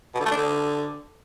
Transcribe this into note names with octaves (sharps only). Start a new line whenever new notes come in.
B2
D3
A3
D4
D3